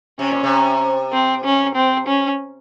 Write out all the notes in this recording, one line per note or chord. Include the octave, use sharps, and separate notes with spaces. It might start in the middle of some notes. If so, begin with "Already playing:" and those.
C3 C#4
A#2
C3
C4
C#4
C4
C#4